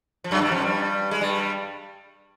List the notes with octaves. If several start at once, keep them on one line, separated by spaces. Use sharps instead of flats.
F3
F#2 F#3
G2 G3
F2 F3
G2 G3
G#3
G2 G3